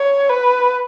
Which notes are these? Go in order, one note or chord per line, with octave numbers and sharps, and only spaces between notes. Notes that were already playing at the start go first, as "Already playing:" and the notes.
Already playing: C#5
B4